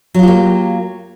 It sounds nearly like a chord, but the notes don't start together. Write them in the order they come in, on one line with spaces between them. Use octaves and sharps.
F#3 F4 G4 A#3